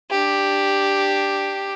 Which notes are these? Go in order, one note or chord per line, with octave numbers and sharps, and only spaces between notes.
D4 G4